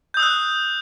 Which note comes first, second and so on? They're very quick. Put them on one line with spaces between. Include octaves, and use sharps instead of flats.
G6 D#6 E6 F#6